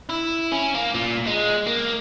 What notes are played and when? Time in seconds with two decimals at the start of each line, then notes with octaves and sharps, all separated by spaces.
0.09 E4
0.52 C#4
0.75 A#3
0.95 A#2
1.27 G#3
1.67 A#3